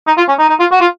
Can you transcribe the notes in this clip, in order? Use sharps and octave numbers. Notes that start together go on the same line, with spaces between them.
D#4
F4
C#4
D#4
D#4
F4
F#4
F4